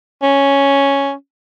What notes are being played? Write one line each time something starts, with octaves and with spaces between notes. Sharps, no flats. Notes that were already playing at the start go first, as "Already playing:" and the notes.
C#4